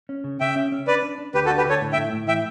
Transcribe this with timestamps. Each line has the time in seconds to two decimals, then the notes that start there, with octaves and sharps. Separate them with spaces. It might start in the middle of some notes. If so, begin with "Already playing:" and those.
0.09 C#4
0.24 C#3
0.40 C#3 E5 G5
0.56 C#4
0.72 C#4
0.87 D4 B4 D5
1.03 D4
1.18 D4
1.34 D2 G4 B4
1.46 F#4 A4
1.50 D4
1.57 G4 B4
1.66 D3 A4 C#5
1.81 A2
1.93 E5 G5
1.97 A2
2.12 A2
2.28 E3 E5 G5